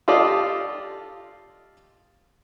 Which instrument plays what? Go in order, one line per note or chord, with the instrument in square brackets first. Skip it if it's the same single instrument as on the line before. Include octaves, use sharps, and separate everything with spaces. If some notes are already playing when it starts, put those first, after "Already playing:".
[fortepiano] F4 G4 A4 D5 D#5 F5